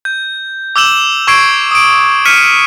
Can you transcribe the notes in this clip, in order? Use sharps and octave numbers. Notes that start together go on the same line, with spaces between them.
G6
D6 E6 G6 E7 F#7
C#6 E6 G#6 C7 D7
D#6 D7
F6 B6 C#7 D#7 E7